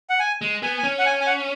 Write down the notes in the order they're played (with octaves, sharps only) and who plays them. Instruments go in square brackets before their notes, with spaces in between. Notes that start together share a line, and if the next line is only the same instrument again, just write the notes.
[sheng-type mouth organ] F#5
G#5
[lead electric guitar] G#3
[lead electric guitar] B3 [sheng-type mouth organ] G#5
[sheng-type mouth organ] G#5
[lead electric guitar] C#4
[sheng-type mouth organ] F#5
G#5
G#5
F#5